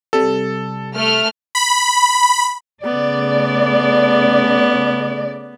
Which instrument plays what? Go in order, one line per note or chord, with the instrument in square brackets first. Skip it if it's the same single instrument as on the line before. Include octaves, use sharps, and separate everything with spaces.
[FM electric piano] C3 G3 [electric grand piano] A4
[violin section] A3 F6
[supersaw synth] B5
[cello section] C#3 A3 D5 [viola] B3